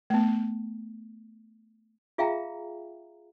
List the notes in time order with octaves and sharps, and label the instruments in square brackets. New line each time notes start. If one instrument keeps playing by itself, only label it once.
[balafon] A3 B3
[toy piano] F4 G#4 E5 F5 G5 A#5